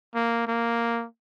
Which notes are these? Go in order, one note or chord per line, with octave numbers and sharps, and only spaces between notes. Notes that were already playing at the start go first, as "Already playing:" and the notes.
A#3
A#3